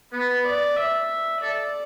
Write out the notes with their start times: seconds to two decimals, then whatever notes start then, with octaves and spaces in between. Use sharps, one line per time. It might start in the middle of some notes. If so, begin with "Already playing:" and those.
0.13 B3 B4
0.45 D5
0.77 E5
1.42 A4 D5